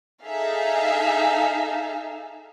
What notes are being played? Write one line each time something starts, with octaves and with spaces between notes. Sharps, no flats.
D#4 G#4 A4 E5 F5